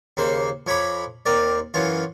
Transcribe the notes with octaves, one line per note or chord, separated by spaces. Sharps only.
D#2 C#3 A#3 C5
F2 C#5 A#5 B5 D6
D#2 C4 A#4 D5
F#2 E3 C#4 F4